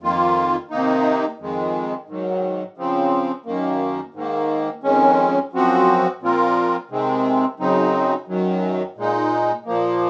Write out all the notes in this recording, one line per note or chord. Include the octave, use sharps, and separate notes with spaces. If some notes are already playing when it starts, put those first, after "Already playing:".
F2 D#3 A#3 F4
C3 D#3 A#3 D#4
F2 D#3 G#3
G#2 D#3 F#3
C#3 F3 C4
F#2 D#3 A#3
G#2 D#3 A#3
F2 D#3 G#3 C#4
F#2 F3 C4 F#4
A#2 F3 C4 F4 A#4
C3 D#3 G#3 C4
F#2 C#3 F#3 C4 D#4
F#2 D#3 F#3
A#2 G#3 D#4
A#2 F3 A#3